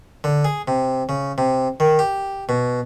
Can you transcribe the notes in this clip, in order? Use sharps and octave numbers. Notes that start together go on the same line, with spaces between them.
D3
G#4
C3
C#3
C3
D#3
G4
B2